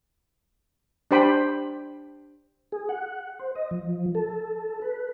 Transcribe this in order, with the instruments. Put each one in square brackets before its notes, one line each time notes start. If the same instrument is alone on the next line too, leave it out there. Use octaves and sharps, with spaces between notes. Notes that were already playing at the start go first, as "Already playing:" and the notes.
[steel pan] D4 G4 C5 G5 B5
[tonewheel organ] G#4
F#5
C5
D#5
F3
A4
B4